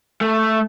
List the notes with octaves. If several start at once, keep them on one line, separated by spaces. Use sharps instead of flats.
A3